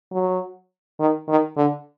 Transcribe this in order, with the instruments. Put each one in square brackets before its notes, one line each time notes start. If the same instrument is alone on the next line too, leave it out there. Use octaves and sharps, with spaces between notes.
[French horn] F#3
D#3
D#3
D3